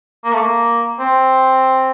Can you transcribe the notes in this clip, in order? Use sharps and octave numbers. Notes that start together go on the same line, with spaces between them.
A#3
A3
A#3
C4